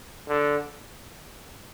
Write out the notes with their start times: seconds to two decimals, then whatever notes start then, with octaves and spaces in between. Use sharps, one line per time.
0.28 D3